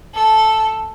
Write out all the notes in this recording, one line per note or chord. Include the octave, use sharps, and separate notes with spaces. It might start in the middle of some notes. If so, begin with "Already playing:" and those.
A4